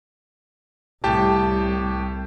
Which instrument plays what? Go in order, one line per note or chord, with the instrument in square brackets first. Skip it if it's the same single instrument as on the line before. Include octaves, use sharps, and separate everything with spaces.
[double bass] C2 [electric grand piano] A2 G4 A5